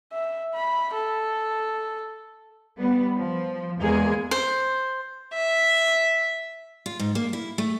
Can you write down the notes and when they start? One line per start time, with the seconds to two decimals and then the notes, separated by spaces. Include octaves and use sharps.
0.13 E5
0.54 B5
0.94 A4
2.78 G3 B3
3.18 F3
3.80 E2 G#3 A#3 G#4
4.31 C5
5.35 E5
6.86 F4
6.99 G#2
7.15 A#3
7.33 E4
7.58 A3